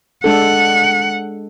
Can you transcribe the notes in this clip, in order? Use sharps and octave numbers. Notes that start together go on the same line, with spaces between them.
G#3 D4 A4 F#5